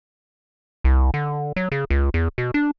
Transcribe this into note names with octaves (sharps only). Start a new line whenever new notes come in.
C2
D3
F#3
C#3
C#2
E2
B2
D4